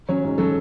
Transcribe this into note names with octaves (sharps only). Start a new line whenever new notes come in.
F#3 C#4 C#5
G#2
F#3 C#4 A4